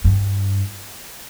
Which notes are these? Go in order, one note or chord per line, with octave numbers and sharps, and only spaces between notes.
G2